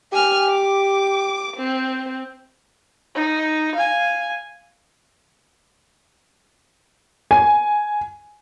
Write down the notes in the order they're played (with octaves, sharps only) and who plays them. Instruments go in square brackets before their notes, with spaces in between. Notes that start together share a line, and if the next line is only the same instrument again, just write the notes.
[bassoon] G4 [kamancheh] G#5 F6
[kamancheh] D6
C4
D#4
F5 G#5
[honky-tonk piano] G#5